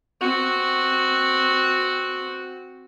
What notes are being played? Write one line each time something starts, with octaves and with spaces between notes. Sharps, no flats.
C4 F#4